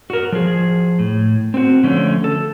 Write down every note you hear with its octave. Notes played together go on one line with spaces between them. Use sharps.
F#4 A#4
F3 G#4
A2
C4 F#4
D3 F3 A3 C#4
A4